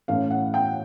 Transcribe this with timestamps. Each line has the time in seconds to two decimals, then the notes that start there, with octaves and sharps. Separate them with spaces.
0.08 A2 E3 A3 C#4 F5
0.31 F#5
0.54 G5